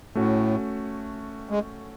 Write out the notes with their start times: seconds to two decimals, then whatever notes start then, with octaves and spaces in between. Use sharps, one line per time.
0.15 A2 A3 C#4 F#4
1.49 G#3